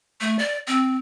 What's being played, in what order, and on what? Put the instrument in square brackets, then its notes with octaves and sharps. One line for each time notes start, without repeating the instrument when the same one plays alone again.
[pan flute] A3
D5
C4